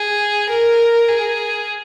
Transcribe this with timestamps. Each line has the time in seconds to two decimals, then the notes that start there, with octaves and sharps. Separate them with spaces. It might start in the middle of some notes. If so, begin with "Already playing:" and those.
Already playing: G#4
0.50 A#4
1.08 G#4